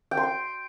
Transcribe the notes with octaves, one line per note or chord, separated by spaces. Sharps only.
G5
C6
G5